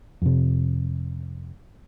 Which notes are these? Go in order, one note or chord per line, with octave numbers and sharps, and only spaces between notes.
F2 C3